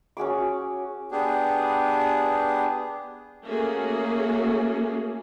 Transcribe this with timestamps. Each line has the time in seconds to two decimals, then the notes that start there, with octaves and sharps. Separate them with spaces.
0.17 C#4 F#4 G#4 D6
1.11 B3 D4 G4 G#4
3.46 A3 A#3 C#4 F#4 G#4